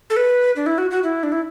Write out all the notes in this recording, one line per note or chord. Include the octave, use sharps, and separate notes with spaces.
A4
B4
D4
E4
F#4
F#4
E4
D4
E4